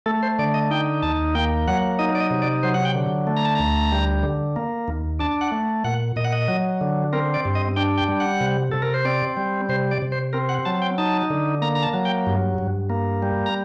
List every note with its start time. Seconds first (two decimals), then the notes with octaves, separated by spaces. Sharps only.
0.06 A3 A4
0.23 C5
0.39 D3 D5
0.54 D#5
0.71 D#4 G5
1.03 D#2 A5
1.35 A#3 G5
1.67 F#3 F#5
1.99 D#4 D#5
2.15 D5
2.20 D#5
2.31 C3
2.42 D5
2.63 F#3 C5
2.74 F#5
2.85 G5
2.95 D3
3.27 A3
3.37 A#5
3.45 A5
3.55 D2 A#5
3.92 G3
4.23 D3
4.56 A#3
4.88 D#2
5.19 D4 A5
5.41 F#5
5.52 A3
5.84 A#2 F#5
6.16 A#2 D#5
6.24 F#5
6.32 D#5
6.48 F#3
6.81 D3
7.13 C4 A#4
7.34 D5
7.45 G2
7.55 D#5
7.76 D4 G5
7.98 G5
8.08 G3
8.20 F#5
8.41 C3
8.72 C3 A4
8.82 A#4
8.94 C5
9.05 C4 D5
9.37 G3
9.69 C3 C5
9.91 D5
10.02 C3
10.12 C5
10.33 C4 A#4
10.49 F#5
10.65 F#3 A5
10.82 G5
10.98 D#4 A5
11.30 D3
11.62 A#3 A#5
11.75 A#5
11.83 A5
11.94 F#3
12.05 G5
12.27 G2
12.58 G2
12.90 A#3
13.22 G3
13.46 A#5